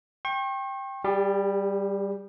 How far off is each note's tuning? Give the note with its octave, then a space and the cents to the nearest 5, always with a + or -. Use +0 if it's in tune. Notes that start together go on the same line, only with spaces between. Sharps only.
G5 +5 C#6 -40
G3 +0 G4 +45